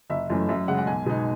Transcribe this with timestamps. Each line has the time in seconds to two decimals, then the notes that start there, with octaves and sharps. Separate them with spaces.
0.10 F#1 E5
0.30 F#2 E3 A3 C#4
0.49 F#2 E5
0.68 C#3 G#3 F#5
0.78 F#5
0.87 B1 G#5
1.06 B2 G#3 D#4